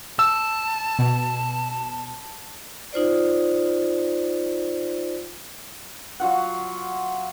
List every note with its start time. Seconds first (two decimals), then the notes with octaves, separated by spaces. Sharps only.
0.19 A5 E6
0.99 B2
2.93 D#4 F4 C5 D5
6.20 F#3 F4 F#5